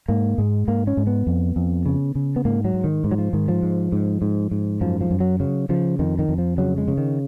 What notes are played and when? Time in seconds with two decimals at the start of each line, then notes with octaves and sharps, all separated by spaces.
0.08 G#2 A#3
0.38 G#2 G#3
0.68 G#2 A#3
0.87 C#4
0.97 G#2
1.07 B3
1.27 F2
1.56 F2
1.86 C#3
2.15 C#3
2.36 B3
2.45 G#2 A#3
2.65 F#3
2.74 G#2
2.84 D#3
3.04 G#2
3.11 F#3
3.18 F3
3.33 G#2 D#3
3.48 F3
3.63 G#2
3.92 G#2
4.22 G#2
4.51 G#2
4.81 F#2 F3
5.01 F3
5.11 F#2
5.20 F#3
5.40 C#3 F#3
5.69 C#3 F3
5.99 F2 D#3
6.19 D#3
6.29 F2
6.38 F3
6.58 C#3 F#3
6.78 G#3
6.88 C#3
6.98 D#3